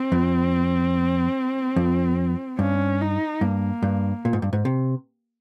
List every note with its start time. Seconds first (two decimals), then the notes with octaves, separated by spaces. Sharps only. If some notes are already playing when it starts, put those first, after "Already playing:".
Already playing: C4
0.12 F2
1.76 F2
2.59 G2 C#4
3.01 D#4
3.41 G2 A#3
3.82 G2
4.25 A#2
4.33 G#2
4.42 G2
4.53 G#2
4.65 C3